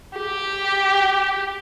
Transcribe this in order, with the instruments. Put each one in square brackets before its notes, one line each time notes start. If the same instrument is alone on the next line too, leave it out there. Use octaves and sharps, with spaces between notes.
[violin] G4